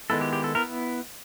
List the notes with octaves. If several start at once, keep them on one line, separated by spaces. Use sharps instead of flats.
D#3 G#3 B3 E4 A4
G4
G4
A4
B3 E4 A#4